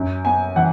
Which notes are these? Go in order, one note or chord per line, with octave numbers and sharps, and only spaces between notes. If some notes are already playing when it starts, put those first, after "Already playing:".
Already playing: F#2
B3 G#5
E3 F#5